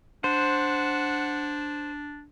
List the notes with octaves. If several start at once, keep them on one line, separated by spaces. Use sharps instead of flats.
D4 C5 F#5